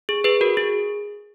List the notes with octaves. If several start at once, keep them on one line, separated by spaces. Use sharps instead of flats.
G#4
G#4 B4
F#4 A#4
G#4